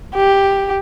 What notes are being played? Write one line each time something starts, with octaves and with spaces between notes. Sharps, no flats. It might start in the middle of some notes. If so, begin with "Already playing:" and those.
G4